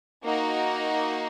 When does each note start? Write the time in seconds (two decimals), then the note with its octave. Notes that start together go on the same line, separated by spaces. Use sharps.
0.24 A#3 D#4 F#4